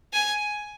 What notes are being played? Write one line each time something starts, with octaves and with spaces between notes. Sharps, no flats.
G#5